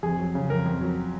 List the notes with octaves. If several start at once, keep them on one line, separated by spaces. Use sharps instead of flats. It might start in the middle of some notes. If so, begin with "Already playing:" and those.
F2 G#4
F#3
C#3
F2 A#4
F2
F#3